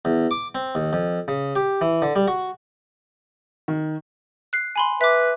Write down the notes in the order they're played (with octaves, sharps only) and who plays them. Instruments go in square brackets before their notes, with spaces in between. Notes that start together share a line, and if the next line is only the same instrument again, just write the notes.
[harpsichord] E2
D6
C4
D#2
F2
C#3
G4
E3
D3
G3
F#4
[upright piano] D#3
[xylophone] F#6 C7
G#5 B5 C6
[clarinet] B4 [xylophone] E5 D6